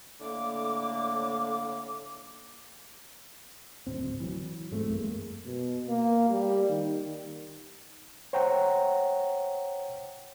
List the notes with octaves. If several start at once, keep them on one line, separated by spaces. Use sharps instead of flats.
A2 D3 A#3 D6
F#1 D2 A2 C4
E3 F#3
G#2 G#3 A3 C4
F#2 G#3 A#3
B2
A#3
G3
D#3
C5 C#5 F#5 G5 A#5